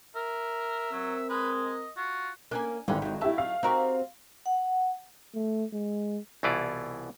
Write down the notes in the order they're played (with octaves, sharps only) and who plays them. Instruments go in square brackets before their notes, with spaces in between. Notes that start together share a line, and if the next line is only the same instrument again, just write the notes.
[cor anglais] A#4 [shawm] E5
[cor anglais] F#3 [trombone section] C4 A#4
[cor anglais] G#3 [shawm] B4
[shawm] D#5
[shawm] F4 [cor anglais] F#4
[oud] A#3 C#4 A#4 [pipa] D4 G#5
[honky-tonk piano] G#1 E4 G5 [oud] D3 C#4 [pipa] F4 B4
[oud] F#3 D#4 [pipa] G4
[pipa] A3 E5 A5 [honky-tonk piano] E4 G4 F5
[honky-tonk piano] F5
[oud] C4 F#4 G4 [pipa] D#4 A#4 C#6
[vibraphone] F#5
[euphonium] A3
G#3
[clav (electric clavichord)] C2 B2 E3 E4 F4 D5